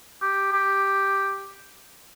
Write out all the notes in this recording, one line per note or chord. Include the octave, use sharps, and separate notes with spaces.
G4
G4